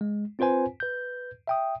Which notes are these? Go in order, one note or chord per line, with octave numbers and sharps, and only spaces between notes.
G#3
C4 F4 B4 C5 G#5
B4 G6
E5 G5 D#6